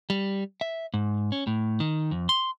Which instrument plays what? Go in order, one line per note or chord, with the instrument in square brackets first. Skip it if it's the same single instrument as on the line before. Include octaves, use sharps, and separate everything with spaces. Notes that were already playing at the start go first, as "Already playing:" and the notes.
[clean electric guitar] G3
E5
G#2
C#4
A2
D#3
F2
C6